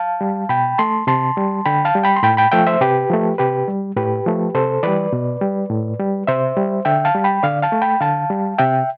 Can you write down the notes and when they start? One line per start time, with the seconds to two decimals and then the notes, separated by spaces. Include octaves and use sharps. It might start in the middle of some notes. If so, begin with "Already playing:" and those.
Already playing: F5 A5
0.21 G3
0.49 B2 G5 B5
0.78 A3 A5 C6
1.07 C3 A5 C6
1.37 G3
1.65 D3 G5 B5
1.85 F5 A5
1.95 G3
2.03 G5 B5
2.16 C6
2.23 A2 G5 B5
2.37 G5 B5
2.52 F3 A3 E5 G5
2.67 C5 E5
2.81 C3 G4 B4
3.10 F3 A3
3.38 C3 G4 B4
3.68 G3
3.96 A2 G4 B4
4.26 F3 A3
4.54 C3 A4 C5
4.83 E3 G3 B4 D5
5.13 B2
5.41 G3
5.70 A2
6.00 G3
6.27 C3 C5 E5
6.56 G3
6.85 D3 E5 G5
7.05 F5 A5
7.15 G3
7.24 G5 B5
7.43 D3 D5 F5
7.62 F5 A5
7.72 A3
7.82 G5 B5
8.01 D3 F5 A5
8.30 G3
8.58 C3 E5 G5